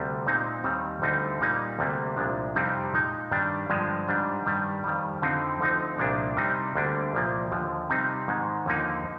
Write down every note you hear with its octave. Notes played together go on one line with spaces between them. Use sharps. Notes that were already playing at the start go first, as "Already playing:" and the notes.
Already playing: D2 C3 G3
A#2 G#3 C4 D#4
D#2 D#3 G3 C4
D2 D3 G3 C4 D#4
A#2 G3 A#3 D#4
D2 C3 G3 A#3
C2 A#2 F3 G#3 D4
F2 C3 G3 C4 D#4
A#2 G#3 D#4
G2 D#3 G3 D4
G2 D3 F3 G#3
G#2 G3 D4
G2 D#3 G3
F2 D#3 G3
F2 D3 F3 C4 D#4
D2 D3 F3 C4 D#4
C2 A#2 F3 A#3 D4
C3 G3 C4 D#4
D2 D3 G3 A#3 D4
C2 A#2 F3 A#3
D#2 D3 F3
C3 G3 C4 D#4
G#2 D#3 G#3
D#2 D3 F3 A#3 D#4